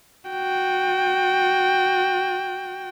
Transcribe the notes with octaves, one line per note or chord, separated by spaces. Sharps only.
F#4 G5